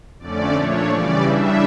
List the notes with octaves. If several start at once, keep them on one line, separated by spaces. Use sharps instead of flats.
F2 D3 A3 C#4 D5
A#2 F3 A3 D4 C#5
C#3 E3 G3 C#4 D5
C#3 E3 G3 D4 E5